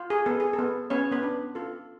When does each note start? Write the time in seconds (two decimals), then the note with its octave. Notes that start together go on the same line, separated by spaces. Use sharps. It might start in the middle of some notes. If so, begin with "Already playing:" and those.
Already playing: F4
0.10 G#4
0.26 B3 A4
0.40 G#4
0.53 A4
0.59 B3
0.90 B3 C#4 C#5
1.12 B3 B4
1.23 D4
1.55 F4 A4